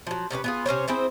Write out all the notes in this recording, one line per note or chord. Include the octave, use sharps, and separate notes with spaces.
F3 F#3
C3 C#4 D4 B4
B3 F4 G#4
C3 C#4 C5 C#5
C4 E4 G#4 C5